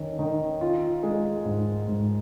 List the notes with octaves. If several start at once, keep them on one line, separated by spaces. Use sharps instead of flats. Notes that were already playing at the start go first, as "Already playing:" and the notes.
Already playing: D#3 C#4
D#3
F4
G#3
G#2
G#2